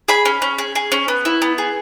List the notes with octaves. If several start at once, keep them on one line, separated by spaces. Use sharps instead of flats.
G#4 B5
C#4
C#4
G#4
G#4
C#4
B3
E4
B3
G#4